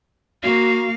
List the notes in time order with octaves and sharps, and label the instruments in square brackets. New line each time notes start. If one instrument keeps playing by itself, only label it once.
[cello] A#3 F5 [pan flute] F#4